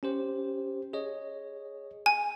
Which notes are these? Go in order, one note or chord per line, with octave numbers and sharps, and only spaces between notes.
C#4 G4 C5
G#4 C#5 D#5
G#5